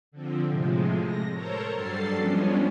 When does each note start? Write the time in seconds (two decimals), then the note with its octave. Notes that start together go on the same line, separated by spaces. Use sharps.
0.12 D3 F3 C4
0.46 A2 C3 F3 G#3
1.04 A#6
1.34 A4 A#4 C5 C#5 A5 A#5
1.72 G2 F#3 G3 A4 A6 C7
2.15 F3 G3 G#3 B3 C#4 D4